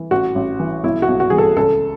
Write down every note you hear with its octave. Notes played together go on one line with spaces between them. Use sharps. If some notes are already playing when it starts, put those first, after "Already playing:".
Already playing: E3
A1 F#4
A1
E3
B1 E4
F#4
B1
F#4
E3 G#4
A4
C#2 A4